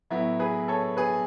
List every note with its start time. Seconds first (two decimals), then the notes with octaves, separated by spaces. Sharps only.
0.10 A2 F#3 B3 E4
0.40 G#4 B4
0.68 A4 C#5
0.97 G#4 B4